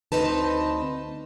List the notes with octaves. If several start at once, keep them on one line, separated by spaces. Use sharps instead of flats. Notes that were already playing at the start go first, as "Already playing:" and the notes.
D2 G#2 C4 D#4 B4 A5